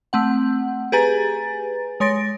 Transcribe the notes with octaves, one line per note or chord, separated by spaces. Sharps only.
A3 C4 F#5
G4 G#4 B4 G#5 A#5 A6
G#3 C#5 C6 A6 A#6 D7